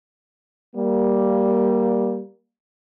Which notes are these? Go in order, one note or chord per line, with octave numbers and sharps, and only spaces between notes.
G3 A#3